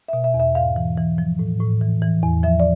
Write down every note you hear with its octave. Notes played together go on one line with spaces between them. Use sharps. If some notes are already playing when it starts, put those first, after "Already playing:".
B2 E5
E5
E2
E5
G#2 F5
E3
E3
F3
A2
A2
E3
E3
E2
F3 E5
D5